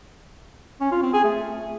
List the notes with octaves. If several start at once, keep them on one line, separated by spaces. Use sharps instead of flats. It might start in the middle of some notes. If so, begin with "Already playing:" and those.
C#4
F4
C4
G#4
A3